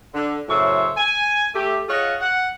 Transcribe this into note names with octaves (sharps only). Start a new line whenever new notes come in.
D3
F#2 A2 C#3 C5 C#5 E5
G#5
A3 G4
F4 G#4 C#5 D#5 F5 F#5
F#5